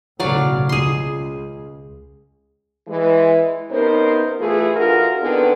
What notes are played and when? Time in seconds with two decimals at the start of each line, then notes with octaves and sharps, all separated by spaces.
0.20 B1 A2 C#3 F#3 D5 F5
0.69 C#2 G#4 C6
2.88 E3 G#3
3.71 C3 B3 C#4 D#4 A#4 C5
4.39 E3 A3 F4 G#4
4.76 D3 E3 F4 F#4 G#4 A#4
5.22 D3 D#3 B3 C4 G#4